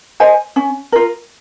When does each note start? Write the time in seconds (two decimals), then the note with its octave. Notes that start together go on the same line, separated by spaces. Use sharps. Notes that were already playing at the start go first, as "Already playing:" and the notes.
0.20 C5 D#5 G#5
0.56 C#4
0.92 F4 A#4